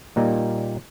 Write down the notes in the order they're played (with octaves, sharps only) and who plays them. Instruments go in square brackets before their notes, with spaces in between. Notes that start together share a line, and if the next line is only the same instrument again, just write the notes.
[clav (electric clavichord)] A#2 G3 A#3 D#4